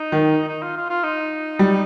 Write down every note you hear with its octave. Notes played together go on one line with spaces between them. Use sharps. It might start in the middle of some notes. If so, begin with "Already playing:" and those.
Already playing: D#4
D#3
D#4
F4
F4
F4
D#4
G3